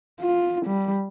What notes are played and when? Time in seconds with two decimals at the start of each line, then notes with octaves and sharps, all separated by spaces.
0.21 F4
0.66 G3